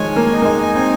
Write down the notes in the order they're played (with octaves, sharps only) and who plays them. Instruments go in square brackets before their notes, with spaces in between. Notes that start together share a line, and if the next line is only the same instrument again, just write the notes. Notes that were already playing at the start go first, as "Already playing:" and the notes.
Already playing: [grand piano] D#3 F3 G#3 [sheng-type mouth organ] C#5 G#5
[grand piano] A#3
[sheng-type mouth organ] D#4
[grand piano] A#3
G#3
[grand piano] C4 [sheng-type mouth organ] G#5